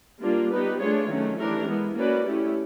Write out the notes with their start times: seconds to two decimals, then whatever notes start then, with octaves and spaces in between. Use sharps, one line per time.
0.21 G3 A#3 D4 F4
0.51 G3 B3 D#4 G4 B4
0.80 A3 D4 F4 G#4 C#5
1.09 D#3 F#3 A3 C#4
1.37 E3 A3 D4 G4 A#4
1.67 G#3 B3 E4
1.96 A#3 C#4 F#4 B4 D5
2.26 A3 C#4 E4 G4